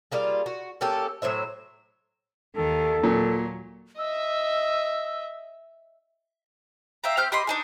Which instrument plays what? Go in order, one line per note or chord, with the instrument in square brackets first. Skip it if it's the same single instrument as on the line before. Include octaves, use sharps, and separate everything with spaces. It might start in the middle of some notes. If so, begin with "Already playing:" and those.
[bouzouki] G3 A#3 F4 G#4
F#4
A#3 C#4 G4 A4
A2 F#3 C5 E5
[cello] D#2 D#3 [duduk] A4
[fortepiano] A#2 [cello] F#3
[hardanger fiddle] D#5 E5 [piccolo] E6
[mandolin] E5 F5 G5 A#5
C4 G4 F6 G6
G4 D#5 B5 C6
D4 D#4 G#4